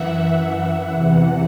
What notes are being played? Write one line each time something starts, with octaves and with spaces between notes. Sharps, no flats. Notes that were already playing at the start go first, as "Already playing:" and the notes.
Already playing: F#2 E3 E5 F#5
F#5
E2 C3 E3